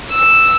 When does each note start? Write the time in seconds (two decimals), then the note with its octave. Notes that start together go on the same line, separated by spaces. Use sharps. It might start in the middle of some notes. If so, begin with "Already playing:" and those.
0.11 E6